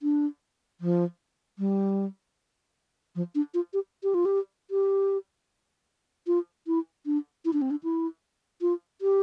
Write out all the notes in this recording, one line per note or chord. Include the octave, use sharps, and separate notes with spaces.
D4
F3
G3
F3
D4
F4
G4
G4
F4
G4
G4
F4
E4
D4
E4
D4
C4
D4
E4
F4
G4